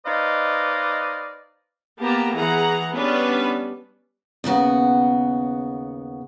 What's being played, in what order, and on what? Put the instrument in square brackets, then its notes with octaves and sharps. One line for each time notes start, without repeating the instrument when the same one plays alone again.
[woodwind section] D#4 B4 C5 D5 D#5 F5
[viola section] A#3 B3 G4 A5 A#5
E3 G#4 F#5 A#5
G3 B3 C#4 D4 B4 B5
[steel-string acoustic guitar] D#2 C#3 B3 F#4